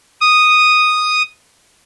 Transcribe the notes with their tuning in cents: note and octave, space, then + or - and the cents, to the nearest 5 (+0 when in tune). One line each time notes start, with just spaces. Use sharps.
D#6 -5